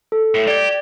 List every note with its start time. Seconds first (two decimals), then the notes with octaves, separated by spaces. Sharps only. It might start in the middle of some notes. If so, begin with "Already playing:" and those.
0.12 A4
0.34 A2
0.48 G4 D5 G#6